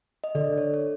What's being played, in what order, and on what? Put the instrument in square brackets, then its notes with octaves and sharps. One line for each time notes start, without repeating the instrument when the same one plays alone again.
[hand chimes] D#5
[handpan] D3 [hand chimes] D5
[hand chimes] C#5
C#5